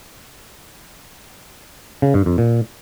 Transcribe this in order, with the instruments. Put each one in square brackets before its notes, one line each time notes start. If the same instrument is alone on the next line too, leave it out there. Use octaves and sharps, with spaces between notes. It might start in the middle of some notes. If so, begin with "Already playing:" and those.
[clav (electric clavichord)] C#3
G2
F2
A#2